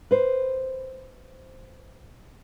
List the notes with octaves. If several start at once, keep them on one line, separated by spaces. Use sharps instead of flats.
B4 C5